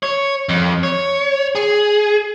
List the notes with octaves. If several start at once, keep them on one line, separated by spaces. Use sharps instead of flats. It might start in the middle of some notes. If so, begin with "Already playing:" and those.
C#5
F2
C#5
G#4